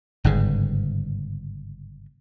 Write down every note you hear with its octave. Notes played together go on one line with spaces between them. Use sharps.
G1 G#2 C#3